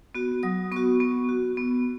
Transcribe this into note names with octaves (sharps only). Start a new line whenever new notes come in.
B3 F#4
F#3 D#6
B3 F#4 C#6
B3
F#4
B3